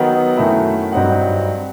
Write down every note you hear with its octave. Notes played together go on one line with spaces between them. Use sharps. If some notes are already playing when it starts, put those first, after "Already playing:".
Already playing: D#3 F#3 B3 D#4 F#5
F#2 D#3 A3 E4
G2 F#3 C4 D#4 F#5